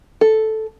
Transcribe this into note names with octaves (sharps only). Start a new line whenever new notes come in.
A4